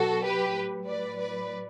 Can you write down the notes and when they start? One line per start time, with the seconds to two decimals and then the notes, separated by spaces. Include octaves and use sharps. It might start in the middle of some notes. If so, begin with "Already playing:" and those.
Already playing: B2 F#3 F#4 A4
0.24 G4 B4
0.55 A2 F#3
0.87 B4 D5
1.18 B4 D5